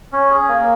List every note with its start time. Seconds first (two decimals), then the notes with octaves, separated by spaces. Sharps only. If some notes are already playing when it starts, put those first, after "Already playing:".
0.12 C#4
0.30 G#4
0.49 A#3